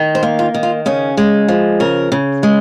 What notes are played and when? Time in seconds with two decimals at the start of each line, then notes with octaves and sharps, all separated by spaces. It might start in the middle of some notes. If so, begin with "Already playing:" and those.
Already playing: D#3
0.15 C5
0.23 A#3
0.39 F4
0.54 D#3
0.63 F4
0.86 C#3 C#4
1.17 G#3
1.48 F3
1.80 C#3 A#4
2.12 C#3
2.43 G#3